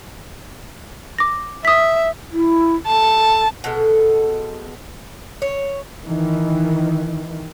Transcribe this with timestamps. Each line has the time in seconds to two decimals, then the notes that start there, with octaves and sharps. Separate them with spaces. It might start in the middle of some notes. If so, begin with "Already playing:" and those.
1.18 D6 A#6
1.65 E5 D#6 B6
2.31 E4
2.87 A4 A5
3.64 B2 G#3 A4
5.42 C#5
6.05 D#3 E3